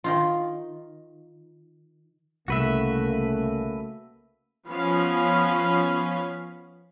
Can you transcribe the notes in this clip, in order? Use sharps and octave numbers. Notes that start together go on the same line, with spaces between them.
D#3 D#4 F4
C2 C#3 A3 A#3 F#4 B4 E5
F3 B3 C#4 F5 B5